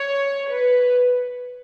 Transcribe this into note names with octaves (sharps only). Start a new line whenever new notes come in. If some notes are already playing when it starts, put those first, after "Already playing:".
Already playing: C#5
B4